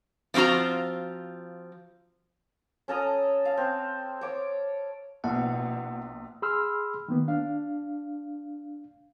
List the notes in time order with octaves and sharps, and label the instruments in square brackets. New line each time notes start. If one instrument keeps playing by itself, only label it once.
[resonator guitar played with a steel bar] F3 C4 F4 F#4 A#5
[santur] C#4 A4 A#5 D#6
F5
C4
C#5 D6
[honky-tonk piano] A#1 [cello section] B2 [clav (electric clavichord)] E4 [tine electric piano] F#5
[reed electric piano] G#4 B5 C6 E6 F6
D#3 A#3 B3
D4 F5